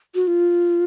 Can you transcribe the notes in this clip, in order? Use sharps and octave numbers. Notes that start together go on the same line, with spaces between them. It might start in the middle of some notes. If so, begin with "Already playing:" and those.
F#4
F4